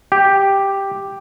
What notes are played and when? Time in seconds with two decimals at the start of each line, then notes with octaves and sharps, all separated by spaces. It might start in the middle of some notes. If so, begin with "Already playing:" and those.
0.12 G4